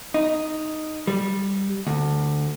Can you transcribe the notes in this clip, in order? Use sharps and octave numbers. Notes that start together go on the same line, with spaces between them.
D#4
G3
D2